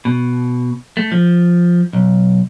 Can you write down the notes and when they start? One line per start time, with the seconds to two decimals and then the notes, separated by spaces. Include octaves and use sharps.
0.05 B2
0.97 A3
1.12 F3
1.93 B1